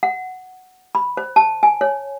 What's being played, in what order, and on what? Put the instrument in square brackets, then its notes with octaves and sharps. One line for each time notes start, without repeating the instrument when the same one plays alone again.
[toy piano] F#5
B5
C5
A5
G#5
C#5